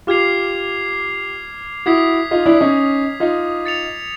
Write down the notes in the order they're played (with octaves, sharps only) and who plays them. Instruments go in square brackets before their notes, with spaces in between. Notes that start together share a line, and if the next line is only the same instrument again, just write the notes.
[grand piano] F4 G4 [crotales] D6 F6 G#6 C7 F7
[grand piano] E4 F#4 [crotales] D#6 G#6 B6
[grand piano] D#4 F4
D4 E4
C#4 D#4
D#4 F4
[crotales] A6 C#7 F7